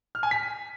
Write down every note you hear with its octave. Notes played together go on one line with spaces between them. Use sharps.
F6
G#5
B6